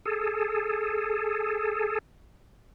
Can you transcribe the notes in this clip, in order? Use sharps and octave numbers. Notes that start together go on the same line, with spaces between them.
G#4 A4